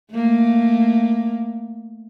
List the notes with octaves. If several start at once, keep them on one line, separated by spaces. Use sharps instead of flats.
A3 A#3